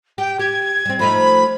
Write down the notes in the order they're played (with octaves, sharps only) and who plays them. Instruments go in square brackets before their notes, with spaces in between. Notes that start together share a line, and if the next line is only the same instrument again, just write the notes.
[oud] G4 [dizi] G5
[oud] G4 [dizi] G#6
[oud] G3 C4
[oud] F3 A3 D#4 [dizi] B5